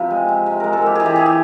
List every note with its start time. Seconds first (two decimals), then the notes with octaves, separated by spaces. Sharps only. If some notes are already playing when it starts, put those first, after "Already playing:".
Already playing: C3 F3 B4
0.11 G#3
0.29 C3
0.46 C3
0.60 G#3 A#4
0.73 A4
0.82 D#3 G4
0.95 E3 G#4
1.06 G4
1.16 E3 G#4
1.26 G4